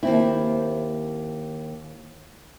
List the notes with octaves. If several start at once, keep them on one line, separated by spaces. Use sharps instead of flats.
D#2 C4 E4